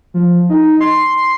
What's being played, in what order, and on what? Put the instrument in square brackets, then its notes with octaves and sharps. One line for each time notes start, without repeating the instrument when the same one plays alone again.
[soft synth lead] F3
D#4
C6